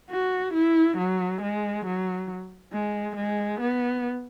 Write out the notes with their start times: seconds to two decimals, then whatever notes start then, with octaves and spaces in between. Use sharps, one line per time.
0.11 F#4
0.54 E4
0.98 F#3
1.42 G#3
1.86 F#3
2.73 G#3
3.16 G#3
3.61 B3